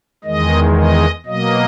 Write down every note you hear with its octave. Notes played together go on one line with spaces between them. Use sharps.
E2 D#3 G#3 D#5
D#5
B2 F#3 A#3 D#5